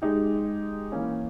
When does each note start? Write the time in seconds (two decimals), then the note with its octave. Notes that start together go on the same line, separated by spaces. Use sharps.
0.02 G#3 D#4 G4
0.92 E3 A#3 C#4